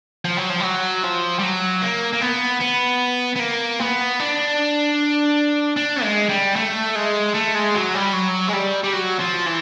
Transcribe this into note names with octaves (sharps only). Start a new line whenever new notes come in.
F3
F#3
F3
G3
F#3
F3
G3
F#3
A#3
A#3
B3
B3
B3
A#3
B3
D4
D4
G#3
G3
A3
G#3
A3
G#3
F#3
G3
F#3
G#3
G3
G3
F#3
F3
E3